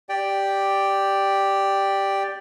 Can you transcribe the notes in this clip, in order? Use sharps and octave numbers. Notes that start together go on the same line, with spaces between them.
G4 D5 G5